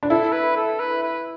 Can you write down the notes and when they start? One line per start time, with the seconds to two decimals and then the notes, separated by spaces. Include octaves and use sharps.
0.03 D4
0.10 E4 A4
0.33 B4
0.57 A4
0.80 B4
1.03 B4